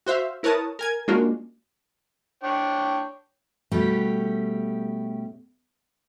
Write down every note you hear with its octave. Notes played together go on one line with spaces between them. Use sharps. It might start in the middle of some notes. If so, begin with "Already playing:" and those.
F#4 C5 E5 F5
E4 A#4 B4 C#5 A5 D#6
A#4 G#5 G#6
G#3 A#3 C#4 D4 F4 F#4
D4 C#5 G5
B2 G3 A3 C#4 G4